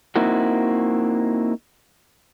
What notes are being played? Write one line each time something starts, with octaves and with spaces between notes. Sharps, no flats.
A#3 C4 D#4 E4 F#4